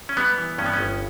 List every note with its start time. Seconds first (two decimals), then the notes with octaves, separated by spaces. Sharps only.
0.09 C#4
0.17 G3 B3
0.38 E3
0.58 G2 C#4
0.66 B3
0.73 C#4
0.78 G1